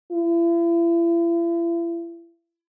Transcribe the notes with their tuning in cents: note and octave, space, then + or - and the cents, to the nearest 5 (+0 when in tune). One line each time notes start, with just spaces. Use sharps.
E4 +40